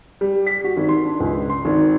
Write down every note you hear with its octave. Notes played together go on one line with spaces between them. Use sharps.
G3
B6
F#4
G#1
C6
D4
C#2
C6
G#1